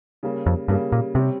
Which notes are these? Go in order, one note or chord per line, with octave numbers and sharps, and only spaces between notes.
C#3 G3 A#3
F2
G2 C#3 G3 A#3
A#2
C3 G3 C4 G4 C#5